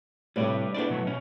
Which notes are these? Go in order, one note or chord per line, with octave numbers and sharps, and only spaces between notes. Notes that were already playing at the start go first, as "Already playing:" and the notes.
A2 C3 G3 B4 D5
B3 D4 E4 C5 D5
B2 F#3 A3
B2 C#4